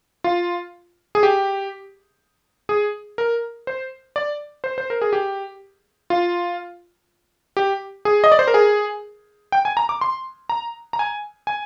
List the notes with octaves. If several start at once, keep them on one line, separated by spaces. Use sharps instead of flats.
F4
G#4
G4
G#4
A#4
C5
D5
C5
C5
A#4
G#4
G4
F4
G4
G#4
D#5
D5
C5
A#4
G#4
G5
G#5
A#5
D6
C6
A#5
A#5
G#5
G#5